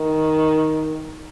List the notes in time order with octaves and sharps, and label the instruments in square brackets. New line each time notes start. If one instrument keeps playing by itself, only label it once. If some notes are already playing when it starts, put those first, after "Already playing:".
Already playing: [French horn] D#3